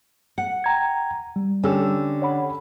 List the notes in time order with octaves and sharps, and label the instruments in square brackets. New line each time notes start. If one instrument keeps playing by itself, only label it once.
[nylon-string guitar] F#5
[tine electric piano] G5 A#5 G#6
G3
[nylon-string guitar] D3 [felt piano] C#4 G4 E6
[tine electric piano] C#5 F#5 B5